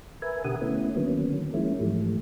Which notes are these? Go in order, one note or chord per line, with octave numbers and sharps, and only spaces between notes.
A#4 B4 E5 G#5
B2 D3 G4 A#4 F#5 D#6
A3 B3 C#4 E4
D3 D#3 F#3 A#3 B3 C#4
F3 G#3 A#3 C#4 E4
G#2 E3 F3 G3 A3